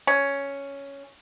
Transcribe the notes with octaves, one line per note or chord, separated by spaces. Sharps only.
C#4